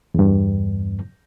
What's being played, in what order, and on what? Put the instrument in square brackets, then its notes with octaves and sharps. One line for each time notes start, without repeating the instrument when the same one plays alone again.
[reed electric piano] E2 G2